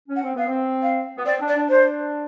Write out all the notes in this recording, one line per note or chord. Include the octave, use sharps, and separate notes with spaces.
C#4
F#5
C4
B3 F5
C4
F5
B3
C4 D5
D4
D5
D4
D4 C5